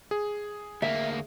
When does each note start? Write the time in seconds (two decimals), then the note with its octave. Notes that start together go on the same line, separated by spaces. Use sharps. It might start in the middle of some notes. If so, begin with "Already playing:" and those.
0.11 G#4
0.82 D2 A#3 E5